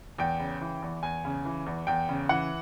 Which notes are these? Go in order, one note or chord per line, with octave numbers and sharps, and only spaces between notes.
E2 G5
C#3
E3
E2
E2 G#5
C#3
E3
E2
E2 G5
C#3
E3 F#5